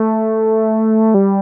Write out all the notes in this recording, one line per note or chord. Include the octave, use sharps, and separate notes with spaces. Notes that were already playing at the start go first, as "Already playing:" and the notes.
Already playing: A3
G3